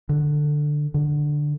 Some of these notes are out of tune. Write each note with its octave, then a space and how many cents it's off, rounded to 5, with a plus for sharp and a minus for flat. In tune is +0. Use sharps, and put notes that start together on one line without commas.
D3 +10
D3 +10